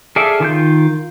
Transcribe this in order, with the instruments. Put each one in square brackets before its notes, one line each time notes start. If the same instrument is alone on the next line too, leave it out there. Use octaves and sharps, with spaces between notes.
[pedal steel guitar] G#4 A4 D5 E5 F5
D#3 F4 G6